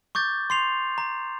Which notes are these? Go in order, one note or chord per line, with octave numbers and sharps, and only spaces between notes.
C#6 D6 G6 A6
C6 C7 F7
A#5